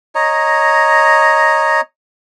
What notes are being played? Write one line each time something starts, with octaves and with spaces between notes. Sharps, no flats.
C#5 D#5 A#5